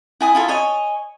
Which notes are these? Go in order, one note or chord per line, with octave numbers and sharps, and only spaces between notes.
E4 G#5 D#6
E4 F4 A4
C#5 D#5 G#5